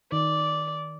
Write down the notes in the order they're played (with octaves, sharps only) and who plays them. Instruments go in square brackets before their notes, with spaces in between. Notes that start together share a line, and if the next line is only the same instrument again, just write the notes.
[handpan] D#3 [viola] D5